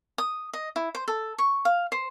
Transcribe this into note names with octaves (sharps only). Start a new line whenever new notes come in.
D#6
D#5
E4
C5
A4
C#6
F5
C5